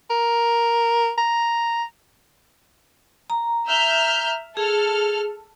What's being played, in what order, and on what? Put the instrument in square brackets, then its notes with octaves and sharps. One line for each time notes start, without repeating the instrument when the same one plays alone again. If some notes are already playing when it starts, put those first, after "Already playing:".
[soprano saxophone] A#4
A#5
[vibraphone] A#5
[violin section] E5 F6 G6
[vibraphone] G#4 [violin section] A4 F6